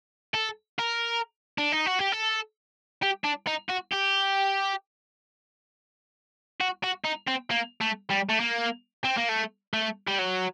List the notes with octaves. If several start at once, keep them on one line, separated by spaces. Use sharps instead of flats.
A4
A#4
D4
D#4
F#4
G4
A4
G4
D4
D#4
F#4
G4
F#4
F#4
D#4
C4
A#3
A3
G3
A3
A#3
C4
A#3
A3
A3
G3
F#3